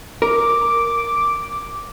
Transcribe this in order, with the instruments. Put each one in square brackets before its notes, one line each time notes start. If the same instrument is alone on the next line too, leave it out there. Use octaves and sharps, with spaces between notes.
[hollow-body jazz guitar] A#4 [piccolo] D6